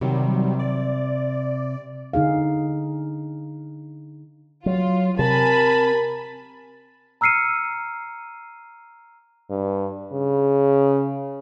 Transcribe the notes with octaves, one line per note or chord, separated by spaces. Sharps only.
C3 D#3 F#3 G3
D5
D3 D#4 G#4 F5
F#3 F4
C3 A#4 G#5 A5 B5
A#5 E6 F6 C7 C#7 D#7
G2
C#3